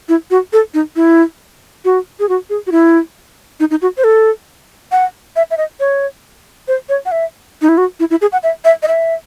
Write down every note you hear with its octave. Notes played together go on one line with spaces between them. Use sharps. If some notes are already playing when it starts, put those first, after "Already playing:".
E4
F#4
A4
D#4
E4
F#4
G#4
F#4
G#4
F#4
E4
D#4
D#4
F#4
C5
A4
F#5
E5
E5
D#5
C#5
C5
C#5
F#5
E5
D#4
E4
F#4
E4
E4
G#4
F#5
E5
E5
D#5
E5